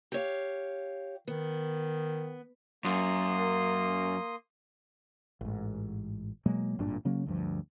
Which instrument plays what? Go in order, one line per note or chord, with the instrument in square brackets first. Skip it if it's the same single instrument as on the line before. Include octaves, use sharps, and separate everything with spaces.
[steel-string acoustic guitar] G4 C#5 F5
[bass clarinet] D#3 [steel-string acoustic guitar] B3
[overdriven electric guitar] F#2 [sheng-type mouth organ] A#3 C6 D#6
[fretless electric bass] A1 G#2
B2 F#3 G#3 A#3
G#1 G2 A#2 D4
C#3 F#3 A#3 C#4
D2 G2 F3